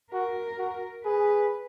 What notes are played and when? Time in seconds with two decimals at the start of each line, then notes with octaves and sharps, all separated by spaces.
0.13 F#4 A#4
0.58 F#4
1.05 G#4 B4